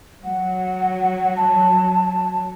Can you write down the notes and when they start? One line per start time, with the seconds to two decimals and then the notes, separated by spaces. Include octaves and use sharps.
0.24 F#3 F#5
1.36 A5